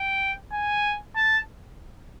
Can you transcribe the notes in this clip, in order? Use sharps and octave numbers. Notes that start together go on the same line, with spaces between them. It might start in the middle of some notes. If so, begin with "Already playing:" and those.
Already playing: G5
G#5
A5